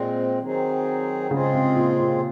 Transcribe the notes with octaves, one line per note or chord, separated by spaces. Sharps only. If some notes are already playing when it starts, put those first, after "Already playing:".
Already playing: A#2 G#3 C4
D#3 F#3 C4 D#4 G#4
C#3 G#3 C4 F4 G#4
C3
A#2
A#2